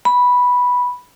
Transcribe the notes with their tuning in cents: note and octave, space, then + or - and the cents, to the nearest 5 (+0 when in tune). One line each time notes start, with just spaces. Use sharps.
B5 -5